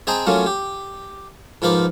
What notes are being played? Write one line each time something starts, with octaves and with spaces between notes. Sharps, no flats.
C4 G#4 D#5 G5 A5 A#5
F#3 A3 A#3 C#4 F4
G4
G#2 F3 F4 A#4 B4 D6